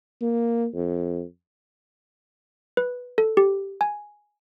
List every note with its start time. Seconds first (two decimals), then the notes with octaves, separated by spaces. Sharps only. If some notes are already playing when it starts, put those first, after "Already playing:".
0.21 A#3
0.74 F2
2.77 B4
3.18 A4
3.37 G4
3.81 G#5